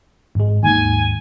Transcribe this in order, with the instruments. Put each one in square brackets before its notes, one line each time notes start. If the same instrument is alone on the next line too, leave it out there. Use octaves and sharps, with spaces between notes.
[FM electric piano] G#1 G#3
[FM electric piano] D#2 G#2 [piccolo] G#5